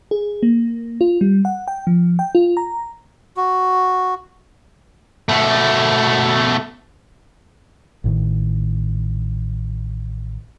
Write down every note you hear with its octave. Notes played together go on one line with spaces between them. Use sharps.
G#4
A#3
F4
G3
F#5
G5
F3
G5
F4
A#5
F#4
B2 A3
A1 A2 D#3